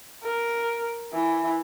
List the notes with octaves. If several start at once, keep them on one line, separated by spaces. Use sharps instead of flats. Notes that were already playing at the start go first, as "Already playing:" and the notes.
A#4
E3